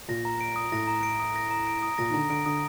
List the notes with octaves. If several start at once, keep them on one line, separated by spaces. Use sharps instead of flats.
A#2 A#6
A#5
D7
D#6
A2 A#6
A#5
D7
D#6
A#6
A#5
D7
D#6
A#2 A#6
D#3
D3 A#5
D3 D7
D3 D#6